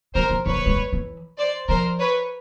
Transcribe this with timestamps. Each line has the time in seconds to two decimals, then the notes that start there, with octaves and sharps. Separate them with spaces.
0.15 F#3 A#4 C5
0.30 F3
0.45 E3 B4 C#5
0.56 F3
0.66 G#3
0.76 G3
0.93 E3
1.39 C5 D5
1.68 F3 A#4 C5
2.00 B4 C#5